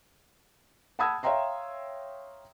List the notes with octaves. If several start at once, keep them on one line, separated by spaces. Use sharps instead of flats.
F#5 A5 B5 D#6 E6 G#6
C#5 E5 F5 G5 A#5 C6